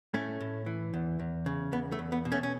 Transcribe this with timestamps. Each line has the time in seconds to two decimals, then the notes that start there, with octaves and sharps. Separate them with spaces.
0.14 A2 A3 C#4
0.40 A2
0.66 E3
0.94 E2
1.20 E2
1.46 C#3
1.72 E2 B3
1.92 A3
1.99 E2
2.12 B3
2.25 B2
2.32 A3 C#4
2.43 C#4